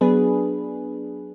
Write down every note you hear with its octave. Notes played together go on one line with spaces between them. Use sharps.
F#3 B3 D4 G#4 B4